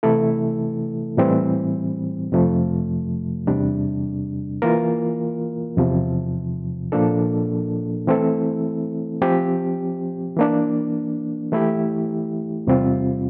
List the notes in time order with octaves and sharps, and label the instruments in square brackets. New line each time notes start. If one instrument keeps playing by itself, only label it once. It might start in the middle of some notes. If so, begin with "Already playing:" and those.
[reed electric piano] C3 E3 A3 E4 A4
A2 E3 G3 C4
F2 C3 F3 A3
E2 C3 G3 D4
E3 A#3 F4 A#4
E2 C3 F3
A#2 F3 A#3 D4 A4
E3 A3 C4 E4 A4
F3 C4 G4
E3 A#3 D4
E3 A3 E4 G4
E2 C3 G3 C4 F4